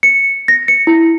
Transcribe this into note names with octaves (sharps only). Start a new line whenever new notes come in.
C#7
A#6
C#7
E4